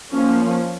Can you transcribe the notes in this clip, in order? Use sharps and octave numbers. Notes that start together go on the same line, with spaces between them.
F3 A#3 C#4